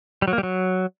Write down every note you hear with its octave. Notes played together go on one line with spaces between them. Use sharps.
G3
F#3
A#3
G3
F#3